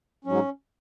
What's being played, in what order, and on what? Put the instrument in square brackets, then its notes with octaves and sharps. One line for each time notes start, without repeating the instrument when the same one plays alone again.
[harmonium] G#2 F#3 C#4